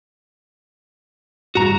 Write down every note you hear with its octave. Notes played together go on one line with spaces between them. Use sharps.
A1 G2 F#4 A#5